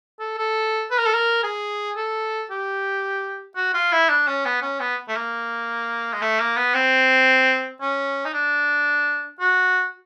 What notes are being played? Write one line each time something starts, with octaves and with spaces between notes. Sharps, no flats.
A4
A4
B4
A#4
A4
A#4
G#4
A4
G4
F#4
F4
E4
D4
C#4
B3
C#4
B3
A3
A#3
G#3
A3
A#3
B3
C4
C#4
D#4
D4
F#4